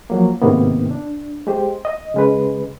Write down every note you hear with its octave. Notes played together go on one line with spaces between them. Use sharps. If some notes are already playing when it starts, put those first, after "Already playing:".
F3 F#3 A#3
G#2 C3 D#3 A#3 B3
D4
G#3 G4 C5
D#5
C#3 G#3 B4